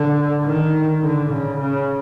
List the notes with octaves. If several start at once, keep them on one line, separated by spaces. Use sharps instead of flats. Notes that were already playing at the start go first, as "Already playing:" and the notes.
Already playing: D3
D#3
D3
C#3
C#3